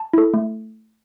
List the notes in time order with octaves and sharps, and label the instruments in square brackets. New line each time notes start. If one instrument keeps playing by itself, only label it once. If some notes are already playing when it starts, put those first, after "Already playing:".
Already playing: [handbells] A5
E4 A4
A3